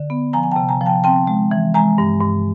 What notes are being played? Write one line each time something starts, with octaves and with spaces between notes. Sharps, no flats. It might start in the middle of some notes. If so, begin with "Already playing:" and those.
Already playing: D3
B3
F3 G#5 A#5
G#5
G5 A5
C3
G#5 A#5
F3
G5 A5
C4 G5 A5
G#3
E3
G#3 G#5 A#5
G2
G2